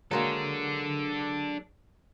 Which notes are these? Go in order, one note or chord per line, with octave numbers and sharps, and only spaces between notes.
F#3 G#3 A#3 D4 A4